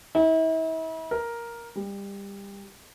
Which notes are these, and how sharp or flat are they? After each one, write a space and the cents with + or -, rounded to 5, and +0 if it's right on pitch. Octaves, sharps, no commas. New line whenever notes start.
E4 -40
A#4 +5
G3 +25